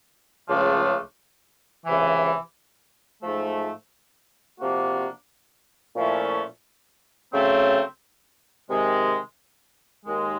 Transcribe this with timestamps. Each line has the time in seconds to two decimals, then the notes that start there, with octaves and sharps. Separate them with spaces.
0.49 C#2 C#3 F3 A3 D4
1.86 C#2 C3 E3
3.23 G#2 F3 A3
4.60 C3 F3 A#3 D4 F#4
5.96 A#2 F3 A3 C#4 E4
7.33 C#3 F#3 A3 C4
8.70 C3 D#3 G#3
10.06 D#2 D#3 G#3